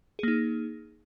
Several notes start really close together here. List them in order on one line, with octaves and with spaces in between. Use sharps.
G#4 A#3 D#4